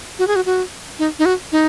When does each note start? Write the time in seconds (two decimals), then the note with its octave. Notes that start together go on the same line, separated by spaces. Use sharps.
0.19 F#4
0.27 G#4
0.36 F#4
0.46 F#4
0.99 D#4
1.19 D#4
1.25 F#4
1.52 D#4